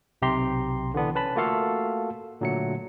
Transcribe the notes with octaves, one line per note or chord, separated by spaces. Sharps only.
B1 C3 G4 A#5 C6
D3 E3 B3 D4
C#4 B4 A5 B5
A3 A#3 F4 F#4 A4 F5
A#2 D3 F#3 A3 C#7